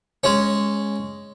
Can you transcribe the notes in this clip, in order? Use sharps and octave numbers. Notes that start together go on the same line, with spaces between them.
G#3 C#4